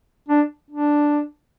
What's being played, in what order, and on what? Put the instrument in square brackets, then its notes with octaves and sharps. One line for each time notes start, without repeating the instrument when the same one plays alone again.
[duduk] D4
D4